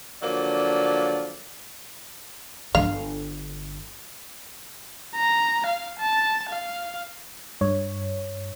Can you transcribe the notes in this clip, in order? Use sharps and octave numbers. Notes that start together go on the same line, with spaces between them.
D3 F3 F#3 A#3 D5
G1 D3 F5
A#5
F5
A5
F5
G2 C#5